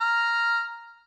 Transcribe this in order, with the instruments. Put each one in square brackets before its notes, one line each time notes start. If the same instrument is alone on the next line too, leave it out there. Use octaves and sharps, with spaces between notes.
[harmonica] A#5 F6